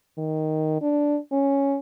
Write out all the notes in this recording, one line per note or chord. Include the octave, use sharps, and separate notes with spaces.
D#3
D4
C#4